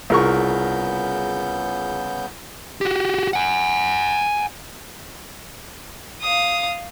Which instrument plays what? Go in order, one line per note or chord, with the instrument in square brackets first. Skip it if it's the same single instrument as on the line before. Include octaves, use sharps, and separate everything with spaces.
[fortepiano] C2 A#4 C#6 [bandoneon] C#3 B3 G6 [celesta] F4 G#4
[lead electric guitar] F#4 G4
F#5 G#5
[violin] F5 D#6